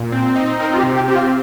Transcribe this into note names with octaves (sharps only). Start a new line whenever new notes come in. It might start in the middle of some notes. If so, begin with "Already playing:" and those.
Already playing: A#2
C4
D#4
C4 A#4
F4
G4
C3
G4
C4 G4
F4